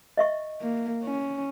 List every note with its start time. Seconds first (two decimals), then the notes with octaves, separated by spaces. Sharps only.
0.17 D#5 E5 C#6
0.62 A#3
1.04 C#4